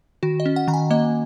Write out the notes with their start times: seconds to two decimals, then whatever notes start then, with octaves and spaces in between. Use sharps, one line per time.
0.23 D#3 F#4
0.40 D#5
0.46 C#4
0.56 F#5
0.68 D#3 A#5
0.74 G#5
0.90 A#3 D#5